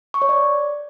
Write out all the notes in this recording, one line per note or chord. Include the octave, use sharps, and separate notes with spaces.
C#6
C#5
D5